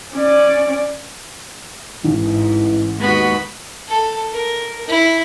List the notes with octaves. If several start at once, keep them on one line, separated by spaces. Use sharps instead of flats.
C#4 D5
A1 G#2 E3
D#2 G#3 B3 F#4 B5
A4
A#4
E4